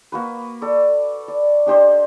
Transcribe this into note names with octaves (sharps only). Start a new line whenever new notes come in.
A#3 F#4 B4
A4 D5
D5
D4 G4 C5 D#5